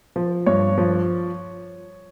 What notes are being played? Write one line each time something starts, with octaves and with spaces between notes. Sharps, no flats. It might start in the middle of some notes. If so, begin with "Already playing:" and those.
F3
G2 C#5
F3